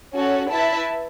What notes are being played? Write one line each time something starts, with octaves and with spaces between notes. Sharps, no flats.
C#4 F#4 A4 C#5
E4 B4 E5 A5